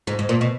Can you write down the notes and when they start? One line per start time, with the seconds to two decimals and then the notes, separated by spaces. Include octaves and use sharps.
0.07 G#2
0.19 G#2
0.29 A#2
0.41 B2